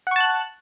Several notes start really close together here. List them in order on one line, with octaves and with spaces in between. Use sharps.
F#5 C#6 A5 F#6